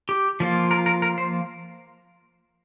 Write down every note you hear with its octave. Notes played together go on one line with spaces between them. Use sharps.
G4
F3 A#3 F4
A#4
A#4
A#4
C5